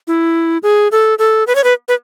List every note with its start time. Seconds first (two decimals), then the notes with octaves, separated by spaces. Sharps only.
0.08 E4
0.63 G#4
0.92 A4
1.19 A4
1.47 B4
1.55 C#5
1.64 B4
1.88 B4